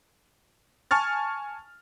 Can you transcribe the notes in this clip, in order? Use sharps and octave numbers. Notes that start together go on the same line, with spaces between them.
G#5 A5 C#6 F6 A6